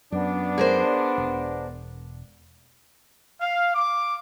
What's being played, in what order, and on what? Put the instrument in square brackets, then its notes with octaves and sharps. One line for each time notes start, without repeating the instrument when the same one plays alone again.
[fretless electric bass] F#2 [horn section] B3 D4
[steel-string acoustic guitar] G#4 A#4 C5
[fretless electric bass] E1
[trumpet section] F5
D6